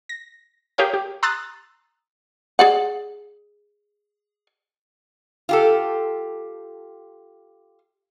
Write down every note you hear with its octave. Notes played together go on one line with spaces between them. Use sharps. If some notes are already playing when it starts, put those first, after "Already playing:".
A#6
G4 G#4 A#4 C#5 F5 G5
G4
A#5 C6 D#6 E6 F#6 A6
G#4 D5 F#5
F4 G4 A4